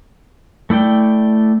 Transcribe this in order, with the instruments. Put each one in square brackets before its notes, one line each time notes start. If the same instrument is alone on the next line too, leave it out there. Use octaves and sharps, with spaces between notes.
[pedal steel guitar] A3 E4 D5 G5